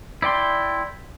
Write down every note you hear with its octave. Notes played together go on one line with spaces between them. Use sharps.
E4 D5 G5 C6